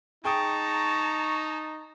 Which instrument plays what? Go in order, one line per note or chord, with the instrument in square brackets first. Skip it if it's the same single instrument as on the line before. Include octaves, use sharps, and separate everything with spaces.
[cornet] D#4 [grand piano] G#4 G5 D#6 [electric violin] A5 A#5 [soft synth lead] C#6